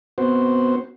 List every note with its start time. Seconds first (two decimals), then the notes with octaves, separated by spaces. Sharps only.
0.18 B3 C4 F#4 C5